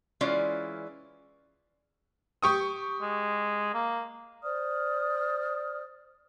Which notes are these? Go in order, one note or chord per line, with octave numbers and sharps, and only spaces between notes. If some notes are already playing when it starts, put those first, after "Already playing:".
E3 G#3 C#4 F4 D5
G4 C#6 D#6
G#3
A#3
C5 D5 D#6 F6